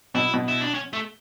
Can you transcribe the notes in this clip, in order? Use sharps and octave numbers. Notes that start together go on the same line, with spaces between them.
B2 E4
B2
E4
D4
C#4
A3